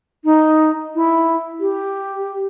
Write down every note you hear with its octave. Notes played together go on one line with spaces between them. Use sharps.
D#4
E4
G4